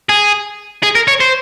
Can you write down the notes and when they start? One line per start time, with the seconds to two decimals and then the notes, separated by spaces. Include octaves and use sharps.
0.09 G#4
0.83 G#4
0.95 A#4
1.08 C#5
1.20 C5